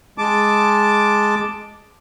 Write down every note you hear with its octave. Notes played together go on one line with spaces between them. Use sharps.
G#3 A5 D6